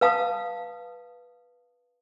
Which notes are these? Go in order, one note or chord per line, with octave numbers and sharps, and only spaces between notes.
B4 F5 A5 D#6